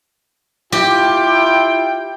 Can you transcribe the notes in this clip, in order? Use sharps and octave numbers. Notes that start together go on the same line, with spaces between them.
E4 F4 G4 G5